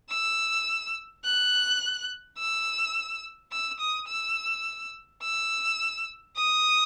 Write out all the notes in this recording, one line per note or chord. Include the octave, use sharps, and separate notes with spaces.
E6
F#6
E6
E6
D#6
E6
E6
D#6